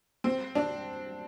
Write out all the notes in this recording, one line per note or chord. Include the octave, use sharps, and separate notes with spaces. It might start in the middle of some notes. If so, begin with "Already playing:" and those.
C4
D4